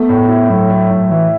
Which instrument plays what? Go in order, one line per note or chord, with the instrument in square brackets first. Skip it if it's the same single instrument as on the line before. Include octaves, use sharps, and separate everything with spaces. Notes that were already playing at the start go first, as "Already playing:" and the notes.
Already playing: [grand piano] A3 [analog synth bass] B3
[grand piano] A2
E4
[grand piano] A2 [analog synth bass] F#3
[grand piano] A3
A2
[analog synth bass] E3 [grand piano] E4